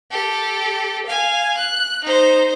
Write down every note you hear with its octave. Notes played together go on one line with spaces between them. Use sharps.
G4 A4
F5 G#5
F#6
D#4 C5